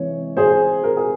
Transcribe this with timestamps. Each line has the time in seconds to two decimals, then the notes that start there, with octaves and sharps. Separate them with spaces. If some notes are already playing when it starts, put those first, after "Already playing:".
Already playing: C3 E3 G#3 C4 C#5
0.37 G#4 C5
0.84 A#4
0.97 G#4